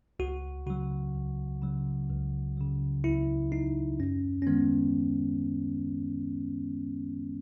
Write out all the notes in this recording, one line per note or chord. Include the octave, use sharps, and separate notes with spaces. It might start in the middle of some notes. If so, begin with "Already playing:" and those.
C#2 F#4
C#3 F#3 F#4
C#2
C#3 F#3
C#2
C#3 F#3
C#2 E4
C#3 F#3 D#4
F#2 C#4
C#4
D#3 G#3 B3